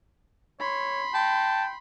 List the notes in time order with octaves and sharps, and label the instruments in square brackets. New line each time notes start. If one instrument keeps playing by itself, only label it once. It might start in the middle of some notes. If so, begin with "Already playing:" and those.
[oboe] C#5 [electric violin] B5 C6
[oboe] G5 [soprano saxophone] A5